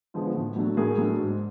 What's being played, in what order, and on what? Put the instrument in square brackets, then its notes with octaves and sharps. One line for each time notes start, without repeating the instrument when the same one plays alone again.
[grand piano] D3 F3 G#3 B3
A2
F#3 A3 D4
A2 G#4 A#4
F#3 A3 D4
G#2